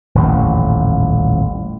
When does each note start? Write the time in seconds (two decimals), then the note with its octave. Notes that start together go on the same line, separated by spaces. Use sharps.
0.15 D#1 A1 F2